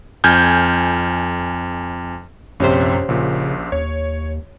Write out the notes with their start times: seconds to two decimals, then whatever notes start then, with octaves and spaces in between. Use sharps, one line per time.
0.24 F2 G#5 F6 G6 G#6
2.60 A#1 F#2 C3 C#4 G4 C5
3.09 A#1 A#2 C#3
3.72 D#2 C#5